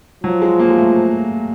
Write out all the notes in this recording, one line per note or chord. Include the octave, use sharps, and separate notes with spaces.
F3 F#3
G#3
A#3
G#3
A3